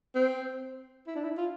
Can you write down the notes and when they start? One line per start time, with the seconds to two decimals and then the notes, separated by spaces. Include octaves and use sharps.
0.15 C4
1.07 E4
1.15 D4
1.24 E4
1.37 F4